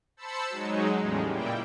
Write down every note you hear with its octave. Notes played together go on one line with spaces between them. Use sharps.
C5 A5 B5 E6 C#7
F#3 G#3 D#4
E2 A2 C#3 G3 G#3 C#4
A#2 G3 A#3 E4 G5